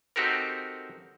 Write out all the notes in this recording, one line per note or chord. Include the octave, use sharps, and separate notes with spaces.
C4 D#4 F#4 G4 A4 A#4